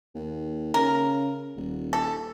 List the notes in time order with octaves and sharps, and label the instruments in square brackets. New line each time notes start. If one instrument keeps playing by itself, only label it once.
[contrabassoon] D#2
[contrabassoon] C#3 [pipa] A#4
[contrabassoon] D#1
[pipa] A4